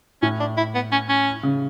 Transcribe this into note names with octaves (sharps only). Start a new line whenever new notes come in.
A2 C#4
D4
E4
B3
C#4
C#4
C#3